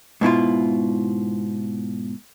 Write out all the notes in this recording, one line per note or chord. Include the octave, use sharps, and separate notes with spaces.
G#2 B2 E4 F4